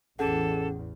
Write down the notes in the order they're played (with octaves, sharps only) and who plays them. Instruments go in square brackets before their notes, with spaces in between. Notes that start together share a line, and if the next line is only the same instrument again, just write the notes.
[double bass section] A1 E2 [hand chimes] C#4 G#4 F#5 [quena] A4